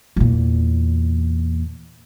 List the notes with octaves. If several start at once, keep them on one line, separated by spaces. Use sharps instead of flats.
E2 A#2